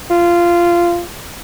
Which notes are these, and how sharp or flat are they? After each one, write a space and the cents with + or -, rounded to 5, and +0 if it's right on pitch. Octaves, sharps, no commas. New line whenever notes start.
F4 -15